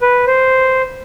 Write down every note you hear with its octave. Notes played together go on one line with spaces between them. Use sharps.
B4
C5